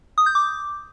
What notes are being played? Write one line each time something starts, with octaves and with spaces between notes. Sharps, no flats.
D#6
G6
D6